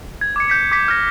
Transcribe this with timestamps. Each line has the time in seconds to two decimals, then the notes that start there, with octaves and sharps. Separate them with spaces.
0.21 G#6
0.36 D6 G#6 C#7
0.48 G6 B6 C#7
0.72 D6 B6
0.88 F6 G6 A#6